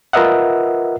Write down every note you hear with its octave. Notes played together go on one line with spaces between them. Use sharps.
F4 A#4 B4 D#5 E5 F#5